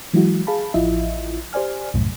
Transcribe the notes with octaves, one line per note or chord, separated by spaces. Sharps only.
E3 F#3 G#3 E4 F#4
G#4 F5 A5 B5
A1 F3 E4 F4 D#5 E5
G4 C5 D5 G#5 F6
C2 F#2 A2